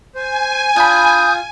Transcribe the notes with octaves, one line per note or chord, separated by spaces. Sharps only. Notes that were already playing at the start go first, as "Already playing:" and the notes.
C5 G#5
D4 F4 B5 D#6 G6